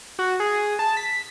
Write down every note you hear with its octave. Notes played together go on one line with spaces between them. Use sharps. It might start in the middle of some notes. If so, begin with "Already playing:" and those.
F#4
G#4
A5
B6